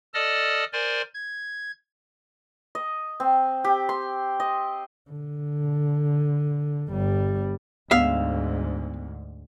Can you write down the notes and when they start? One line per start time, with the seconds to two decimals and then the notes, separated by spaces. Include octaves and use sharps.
0.14 A4 D5 D#5 A5 D#6 F6
0.73 A#4 C5 D5 G#5 C6
1.14 G#6
2.75 D#5
3.20 C4
3.64 G4
3.89 C6
4.40 D#5
5.11 D3
6.90 G1 G3
7.91 D2 G#2 B3 E5 F5